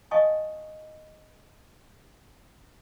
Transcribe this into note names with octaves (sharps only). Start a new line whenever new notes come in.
D#5 F5 G#5 A5 C#6 D#6